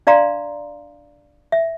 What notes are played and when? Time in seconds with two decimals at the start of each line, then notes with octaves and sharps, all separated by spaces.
0.07 D4 D5 F5 A#5 C6
1.52 E5